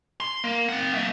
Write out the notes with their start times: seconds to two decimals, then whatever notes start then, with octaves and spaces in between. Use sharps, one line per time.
0.20 C6
0.44 A#3
0.69 C4 F#5
0.94 A#3 E5